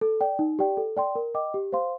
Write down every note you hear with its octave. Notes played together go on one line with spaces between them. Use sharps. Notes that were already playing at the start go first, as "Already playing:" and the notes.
A4
D5 G5
D#4
G4 D5 G5
A4
D5 G5 C6
A#4
D#5 G5 D6
G4
C5 F5 C6